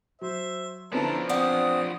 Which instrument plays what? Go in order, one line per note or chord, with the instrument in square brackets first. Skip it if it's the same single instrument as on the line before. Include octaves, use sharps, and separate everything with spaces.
[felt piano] F#3 [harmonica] C5 E5
[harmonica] D3 A4 A#5 [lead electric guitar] F3 D4 [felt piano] B3 C#4 E4
[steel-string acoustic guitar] C4 D5 F#5 [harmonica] D#6